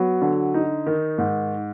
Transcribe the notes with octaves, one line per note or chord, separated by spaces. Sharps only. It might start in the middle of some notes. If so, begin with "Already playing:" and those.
Already playing: F#3 B3
D3
D#4
D#3
G#2